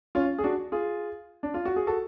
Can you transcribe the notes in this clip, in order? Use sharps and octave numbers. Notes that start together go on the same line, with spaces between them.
C#4 F4
G#4
D4 F#4
F4 G#4
D4
F4
F#4
G#4
F#4 A4